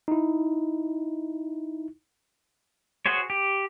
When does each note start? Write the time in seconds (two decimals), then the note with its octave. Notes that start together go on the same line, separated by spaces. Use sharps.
0.08 D#4 E4
3.06 F#4 G#4 C5 C#5
3.30 G4